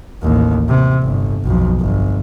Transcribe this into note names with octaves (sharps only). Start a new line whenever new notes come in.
A1 D#2
C3
G1
B1 F2
G1